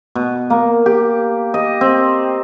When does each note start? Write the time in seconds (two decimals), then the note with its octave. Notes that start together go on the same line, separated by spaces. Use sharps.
0.15 B2
0.50 A#3
0.86 G4
1.54 D#5
1.81 C4